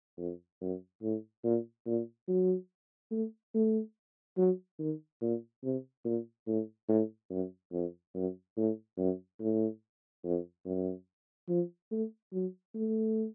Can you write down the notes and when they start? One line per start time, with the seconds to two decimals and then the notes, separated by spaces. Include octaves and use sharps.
0.18 F2
0.61 F#2
1.02 A2
1.44 A#2
1.87 A#2
2.28 F#3
3.11 A3
3.54 A3
4.37 F#3
4.80 D#3
5.22 A#2
5.64 C3
6.05 A#2
6.47 A2
6.89 A2
7.30 F#2
7.72 F2
8.15 F#2
8.57 A2
8.98 F#2
9.40 A2
10.24 F2
10.66 F#2
11.49 F3
11.91 A3
12.33 F#3
12.75 A3